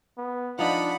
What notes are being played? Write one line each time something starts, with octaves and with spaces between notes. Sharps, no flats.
B3
F3 D4 D#4 F#5 B5